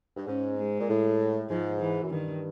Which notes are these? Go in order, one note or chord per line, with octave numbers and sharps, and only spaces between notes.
G2
G#2 C#4
G#3
A#2
A2
G#2 F3
E3
F#2
G2 D#3